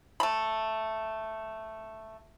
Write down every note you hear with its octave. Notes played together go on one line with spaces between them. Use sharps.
A3 B5